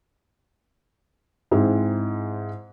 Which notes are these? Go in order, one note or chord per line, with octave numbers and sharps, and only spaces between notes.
G#2 G#3 C4 E4 G#4